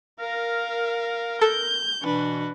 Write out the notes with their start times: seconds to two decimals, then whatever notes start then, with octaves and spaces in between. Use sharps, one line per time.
0.20 A#4 F5
1.41 A4 G6
2.03 B2 E3 D4 F#4 B4